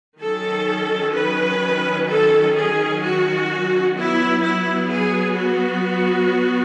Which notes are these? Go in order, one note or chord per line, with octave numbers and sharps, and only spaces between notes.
D#3 F#3 C#4 A4
B4
A4
G#4
F#4
F#3 B3 E4
E4
G#4
F#4